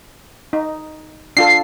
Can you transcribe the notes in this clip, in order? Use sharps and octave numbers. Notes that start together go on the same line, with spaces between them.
D#4
D4 F4 A4 C7